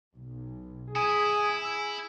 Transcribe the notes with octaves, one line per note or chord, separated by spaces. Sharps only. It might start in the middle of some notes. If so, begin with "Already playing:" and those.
B1
E4 G#4 G#5 D#6
E6